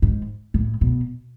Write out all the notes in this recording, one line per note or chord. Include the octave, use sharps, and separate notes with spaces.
G#2
A2
B2